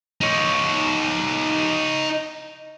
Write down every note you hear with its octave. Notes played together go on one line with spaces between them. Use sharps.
D#4 C#5